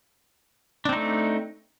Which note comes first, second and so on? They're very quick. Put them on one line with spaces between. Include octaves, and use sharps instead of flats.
D4 C4 D#4 A3